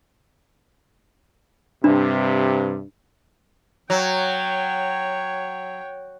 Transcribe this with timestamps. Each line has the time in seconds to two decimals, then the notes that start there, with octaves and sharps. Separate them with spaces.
1.84 G2 C3 D4
3.90 F#3 C#5 G5